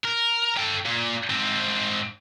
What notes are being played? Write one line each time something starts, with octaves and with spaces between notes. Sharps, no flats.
A#4
A4 G5
A#2
G#2 C4